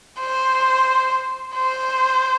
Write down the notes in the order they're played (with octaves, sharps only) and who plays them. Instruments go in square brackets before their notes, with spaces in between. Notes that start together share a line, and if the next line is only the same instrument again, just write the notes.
[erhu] C5
C5